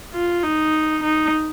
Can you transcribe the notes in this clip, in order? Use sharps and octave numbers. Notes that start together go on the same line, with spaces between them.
F4
D#4
D#4